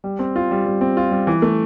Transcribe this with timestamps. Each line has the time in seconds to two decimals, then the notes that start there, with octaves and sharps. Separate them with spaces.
0.04 G3
0.19 C4
0.36 F4
0.51 G3
0.66 G3
0.81 C4
0.97 F4
1.11 G3
1.27 E3
1.42 A3